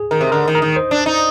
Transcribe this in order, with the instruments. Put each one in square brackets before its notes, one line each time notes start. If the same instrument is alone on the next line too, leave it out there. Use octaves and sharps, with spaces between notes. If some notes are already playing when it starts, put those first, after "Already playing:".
Already playing: [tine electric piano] G#4
[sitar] D#3 [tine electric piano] A#4
[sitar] C3
[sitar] D3 [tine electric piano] A#4
[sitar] D#3
[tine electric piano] A#4
[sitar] D#3
[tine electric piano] C5
[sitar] D4
D#4